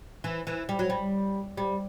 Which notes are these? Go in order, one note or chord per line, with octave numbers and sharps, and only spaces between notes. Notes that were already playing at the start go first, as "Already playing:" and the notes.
E3
E3
G3
F#3
G3
G3